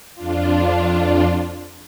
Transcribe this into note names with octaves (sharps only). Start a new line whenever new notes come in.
F2 D4 F4